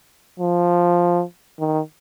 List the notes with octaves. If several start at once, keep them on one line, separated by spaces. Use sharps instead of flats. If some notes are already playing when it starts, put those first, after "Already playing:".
F3
D#3